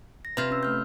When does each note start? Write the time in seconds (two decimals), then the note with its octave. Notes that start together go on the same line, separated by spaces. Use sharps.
0.25 A#6
0.37 C3 F4 B4
0.51 C#4 E6
0.63 A3 F6 G6